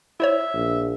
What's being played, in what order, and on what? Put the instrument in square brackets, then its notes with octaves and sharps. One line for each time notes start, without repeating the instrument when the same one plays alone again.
[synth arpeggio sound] E4 C5 C#5 [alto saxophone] E5
[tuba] A#1